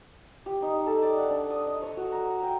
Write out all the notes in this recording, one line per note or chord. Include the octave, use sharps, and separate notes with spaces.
G4
D#4
A4
D5
F#5
D4
D#6
D#5
C#5
F#4
A#5
G5